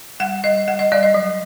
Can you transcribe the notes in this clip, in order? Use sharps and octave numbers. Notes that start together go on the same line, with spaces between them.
G3 F#5
G3 D#5
G3 F#5
D#5
G3 D5
D#5
F#3